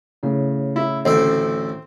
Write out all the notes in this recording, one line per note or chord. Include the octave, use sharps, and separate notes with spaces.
A2 C#3
E4
A1 D2 C4 E5